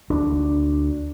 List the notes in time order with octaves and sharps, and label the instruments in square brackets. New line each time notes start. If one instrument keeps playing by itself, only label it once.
[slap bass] D2 D4